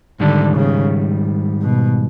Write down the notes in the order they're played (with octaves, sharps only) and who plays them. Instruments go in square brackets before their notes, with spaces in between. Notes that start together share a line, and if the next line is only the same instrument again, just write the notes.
[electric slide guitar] G#2 D#3 G3 [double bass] D3
[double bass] C#3
B2